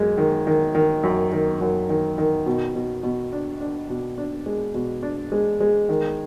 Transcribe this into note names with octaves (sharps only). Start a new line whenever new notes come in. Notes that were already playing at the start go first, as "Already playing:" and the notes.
Already playing: F#2 G#3
D#3
D#3
D#3
F#2
D#3
F#2
D#3
D#3
B2
B2
B2
D4
D4
B2
D4
G#3
B2
D4
G#3
G#3
D#3